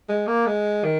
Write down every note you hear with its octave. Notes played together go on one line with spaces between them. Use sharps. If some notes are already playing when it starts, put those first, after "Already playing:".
G#3
A#3
G#3
D#3